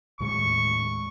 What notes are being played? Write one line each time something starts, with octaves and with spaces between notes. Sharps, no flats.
D#2 A2 G#3 C#6